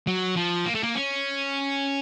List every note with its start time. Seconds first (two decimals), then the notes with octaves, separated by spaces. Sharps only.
0.07 F#3
0.37 F3
0.66 A#3
0.75 A3
0.83 A#3
0.95 C#4